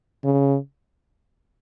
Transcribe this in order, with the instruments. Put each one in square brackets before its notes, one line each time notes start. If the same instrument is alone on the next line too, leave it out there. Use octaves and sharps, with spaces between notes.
[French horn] C#3